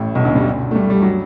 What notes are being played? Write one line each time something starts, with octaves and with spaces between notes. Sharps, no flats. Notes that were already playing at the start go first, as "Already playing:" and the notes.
Already playing: A1 A2
B1 B2
D2 D3
G2 G3
A3
G2 G3
G3
F#3